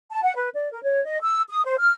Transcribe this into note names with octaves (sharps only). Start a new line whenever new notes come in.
A5
F#5
B4
D5
A#4
C#5
D#5
E6
D#6
C5
F6